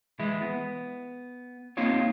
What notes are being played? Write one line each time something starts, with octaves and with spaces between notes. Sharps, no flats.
E3 G#3 E4
B3
A#3 C4 D#4 F4 G4 C#5